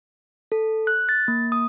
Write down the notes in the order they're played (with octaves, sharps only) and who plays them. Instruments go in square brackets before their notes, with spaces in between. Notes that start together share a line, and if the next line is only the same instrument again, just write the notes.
[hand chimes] A4
F#6
A6
A#3
D#6